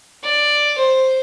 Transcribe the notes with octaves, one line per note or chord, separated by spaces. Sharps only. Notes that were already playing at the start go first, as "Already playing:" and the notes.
D5
C5